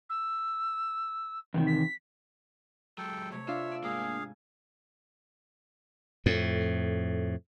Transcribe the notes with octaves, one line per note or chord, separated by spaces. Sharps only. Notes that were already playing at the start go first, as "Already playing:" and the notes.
E6
E2 C3 D#3
B6
F#3 G#3 A4 G5
C3 A3 C#5
D4 F4 E5 F5 C6 E6
D5 E6
G#2 A#3 G#4 F5
G#5
F2 A2